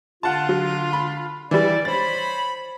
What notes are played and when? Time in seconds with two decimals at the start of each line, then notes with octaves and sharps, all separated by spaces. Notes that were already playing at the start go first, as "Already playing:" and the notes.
0.23 D3 D4 F4 F#5 A5
0.49 F#3
0.93 B5
1.51 E3 G3 D5
1.85 C5 C#5 B5 A6